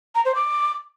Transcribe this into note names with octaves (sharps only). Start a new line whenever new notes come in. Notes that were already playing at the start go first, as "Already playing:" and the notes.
A#5
C5
D6